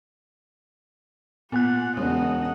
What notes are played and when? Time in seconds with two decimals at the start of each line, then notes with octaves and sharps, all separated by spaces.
1.52 A#2 B3 F#5 G#5 F#6
1.97 E1 C#3 G#3 D#5 F#5